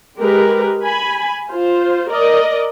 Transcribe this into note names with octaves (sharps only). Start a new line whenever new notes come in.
G#3 G4 A#4 B4
G#5 B5
F4 C5
A#4 D5 D#5